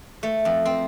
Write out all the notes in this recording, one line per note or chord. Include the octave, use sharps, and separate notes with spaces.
A3
F2
C4